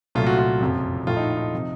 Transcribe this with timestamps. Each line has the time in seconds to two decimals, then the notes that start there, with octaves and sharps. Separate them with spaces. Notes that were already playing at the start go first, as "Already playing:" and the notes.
0.15 C2 A#2 F#3 A3 F4
0.27 F#4
0.38 F4
0.61 F#1 F2 C3 F3
1.07 A#1 A2 A3 F4
1.17 D#4
1.37 D#4
1.53 C3 F3